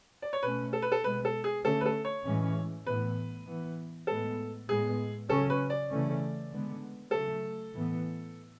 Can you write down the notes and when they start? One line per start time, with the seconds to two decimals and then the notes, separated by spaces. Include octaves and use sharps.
0.22 D5
0.33 C#5
0.43 B2 A3 C#4 B4
0.73 A4
0.82 B4
0.92 A4
1.03 B2 G#3 B3 B4
1.25 A4
1.44 G#4
1.65 D3 A3 C#4 A4
1.81 B4
1.86 A4
2.05 C#5
2.25 A2 E3 G#3 C#4
2.87 A2 E3 B3 B4
3.47 E3 B3
4.07 A2 G#3 B3 A4
4.68 A2 G#3 B3 G#4
5.29 C#3 F#3 C#4 A4
5.50 B4
5.70 D5
5.90 C#3 E3 A3 C#4
6.51 D3 G#3 B3
7.11 C#3 F#3 A3 A4
7.73 A2 E3 B3